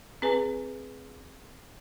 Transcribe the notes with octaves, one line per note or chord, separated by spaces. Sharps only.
C4 G#4 B4 G#5